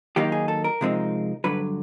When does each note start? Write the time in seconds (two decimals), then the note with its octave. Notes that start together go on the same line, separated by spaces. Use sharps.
0.16 D#3 F#3 A#3 D#4 G4
0.32 G#4
0.48 A4
0.64 A#4
0.81 C3 F3 G#3 C4 D#4
1.44 G2 D3 F#3 B4